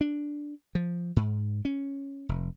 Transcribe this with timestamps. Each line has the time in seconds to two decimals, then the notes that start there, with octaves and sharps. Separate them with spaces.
0.01 D4
0.75 F3
1.16 G#2
1.65 C#4
2.29 F1